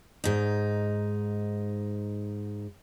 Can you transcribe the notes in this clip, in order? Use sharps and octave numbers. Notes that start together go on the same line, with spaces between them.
G#2 D#4